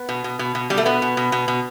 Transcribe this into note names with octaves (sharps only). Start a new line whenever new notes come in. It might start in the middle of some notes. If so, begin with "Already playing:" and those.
Already playing: B3
B2
B2
B2
B2
B2 G3
A3
B2 B3
B2
B2
B2
B2